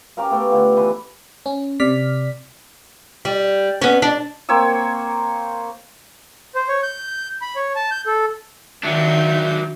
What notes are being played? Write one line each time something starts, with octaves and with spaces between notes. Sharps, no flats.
C#4 G4 A#4 F5
A3 B3 G5
D3 F4
E3 B4
C#4
C3 D5 F6 B6
G3
B3 C#4
D4
A#3 C4 C#5 E6
C5
C#5
G6
B5
C#5
A5
G6
A4
D#3 F#3 D4 E5 G6